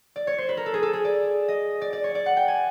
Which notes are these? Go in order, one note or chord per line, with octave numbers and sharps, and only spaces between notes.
D5
C#5
C5
B4
A#4
A4
G#4
A4
G#4
D5
D#5
D5
D5
C#5
D5
F#5
G5
G#5